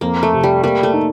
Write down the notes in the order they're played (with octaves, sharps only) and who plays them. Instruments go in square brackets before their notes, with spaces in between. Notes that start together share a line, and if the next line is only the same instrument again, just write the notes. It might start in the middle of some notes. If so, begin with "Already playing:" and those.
[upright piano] F2 [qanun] A#3
[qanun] A3
[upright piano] C3
[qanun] G3
[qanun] G3 [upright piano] A#3
[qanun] A3
[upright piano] D#4